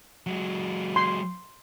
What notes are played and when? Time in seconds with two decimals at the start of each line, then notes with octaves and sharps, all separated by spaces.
0.26 F#3 G#3
0.96 C6